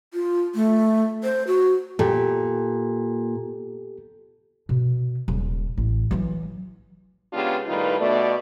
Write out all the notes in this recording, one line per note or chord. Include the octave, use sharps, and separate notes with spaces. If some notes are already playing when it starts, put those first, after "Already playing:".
F4
A3
C5
F#4
A#2 G4 A4
B2
D#1
A1
E3 F#3
C#3 G#3 B3 D4 F4 G4
A2 D#3 G3 D#4 F4 B4
B2 A3 D5